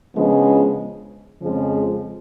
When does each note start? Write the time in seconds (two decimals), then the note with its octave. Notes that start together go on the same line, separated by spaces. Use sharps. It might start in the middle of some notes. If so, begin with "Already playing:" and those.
0.15 C#3 F3 G#3 B3 D4
1.42 F2 C#3 F3 G#3